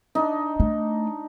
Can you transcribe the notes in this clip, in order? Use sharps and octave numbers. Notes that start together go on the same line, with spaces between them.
D4 D#4
A3